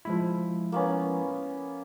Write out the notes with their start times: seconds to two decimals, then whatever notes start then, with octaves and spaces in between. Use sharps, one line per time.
0.05 F3 G#3 E4
0.72 A#3 B3 C#4